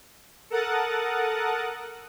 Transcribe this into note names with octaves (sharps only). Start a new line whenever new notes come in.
A4 A#4 F#5 D#6 F#6 A6